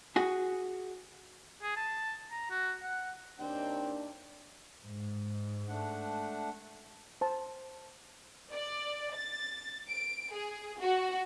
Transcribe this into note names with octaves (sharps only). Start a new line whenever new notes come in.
F#4 G#4
G#4
A5
A#5
F#4
F#5
D#2 C4 D4 G5
G#2
A3 D4 F#5
C5 A5
D5
A6
D7
G#4
F#4